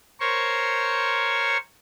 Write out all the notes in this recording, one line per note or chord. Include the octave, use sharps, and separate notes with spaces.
A#4 C5 C#5 C#6